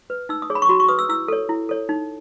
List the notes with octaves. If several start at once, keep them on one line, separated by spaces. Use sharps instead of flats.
B4
D#4 E6
D#6
G#4 C#5
B5
C#6
F#4 B5
C#6
B4 D#6
E6
E4 E6
A4 C#5
E4
A4 C#5
D#4